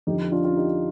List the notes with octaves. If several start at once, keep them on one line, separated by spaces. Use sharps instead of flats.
F2 D3 F3 D#4 G4
D4 F4
F4
D#4 G4